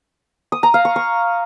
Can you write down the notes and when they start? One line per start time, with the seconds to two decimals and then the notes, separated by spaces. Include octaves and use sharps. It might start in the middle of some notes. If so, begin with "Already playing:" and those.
0.52 D#6
0.63 A#5
0.74 F5
0.85 C#6
0.96 C#6